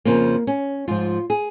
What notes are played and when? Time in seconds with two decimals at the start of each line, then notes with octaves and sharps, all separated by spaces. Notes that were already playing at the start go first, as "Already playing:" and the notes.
0.05 F2 C#3 F3 A#3
0.47 C#4
0.88 G#2 F3 F4
1.30 G#4